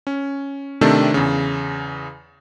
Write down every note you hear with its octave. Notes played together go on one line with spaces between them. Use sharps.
C#4
C3 D#3 A3 C4 D4 A4
E2 C#3